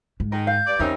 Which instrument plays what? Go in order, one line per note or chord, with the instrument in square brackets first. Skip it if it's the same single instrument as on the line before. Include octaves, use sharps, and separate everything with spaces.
[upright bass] G#2
[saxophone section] D#3 G#3 D#4 [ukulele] A#4
[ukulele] F5 [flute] G6
[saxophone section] G2 D5
[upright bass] E2 [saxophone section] G3 C4 C#4 [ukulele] D#4 A#4 E5